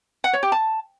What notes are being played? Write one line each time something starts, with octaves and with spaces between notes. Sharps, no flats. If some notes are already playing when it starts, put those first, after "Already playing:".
F#5
C#5
G4
A5